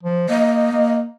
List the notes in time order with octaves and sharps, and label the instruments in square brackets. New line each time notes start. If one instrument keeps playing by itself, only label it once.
[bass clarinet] F3
[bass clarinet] A#3 [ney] D#5
[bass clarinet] A#3